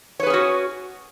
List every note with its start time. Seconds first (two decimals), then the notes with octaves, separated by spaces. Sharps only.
0.20 C#5
0.23 B4
0.27 G#4
0.30 C#4
0.34 F#4